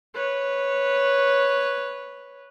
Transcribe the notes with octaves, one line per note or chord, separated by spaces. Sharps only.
B4 C#5